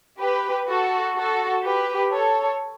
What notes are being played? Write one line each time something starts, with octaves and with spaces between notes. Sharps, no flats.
G4 B4
F#4 A4
F#4 A4
G4 B4
A4 C#5